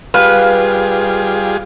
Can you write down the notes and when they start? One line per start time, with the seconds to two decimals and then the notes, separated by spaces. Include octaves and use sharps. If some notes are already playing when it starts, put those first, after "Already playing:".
0.14 G3 F4 G#4 B4 F5